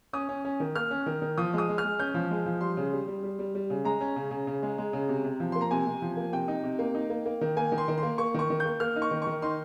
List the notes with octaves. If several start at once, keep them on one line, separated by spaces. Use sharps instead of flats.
C#4 D#6
C#4
C#4
D#3
A#3 F6
C#4
D#3
D#3
F3 D#6
G#3 D#6
G#3
F6
G#3
C#4 G6
F3
G#3
F3
G3 C6
C#3
G3
G3
G3
G3
G3
C#3
G#3 A#5
C#4
C#3
C#3
C#3
G#3
G#3
C#3
C3
C3
F3
A#3 C6
A#5
C3 G#5
C3
F3
A#3
C3 G5
D#4
C3
A#3
D#4
A#3
A#3
D#3
A#3 G#5
D#3
C6
D#3
C6
A#3
A#3 C#6
D#3 C#6
D#3
G6
A#3
A#3 F6
D#4
C#6
D#3
C#6
D#3
D#4 C6